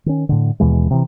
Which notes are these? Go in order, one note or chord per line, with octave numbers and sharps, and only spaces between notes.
D#3 C#4
A2 D3
D#2 B2 E3 G#3
C3 E3